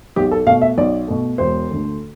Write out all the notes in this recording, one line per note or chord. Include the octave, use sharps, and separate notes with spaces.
B1 G4
A4
B2 A3 F5
E5
B1 D5
B2 A3
E1 C5
D2 D3 A3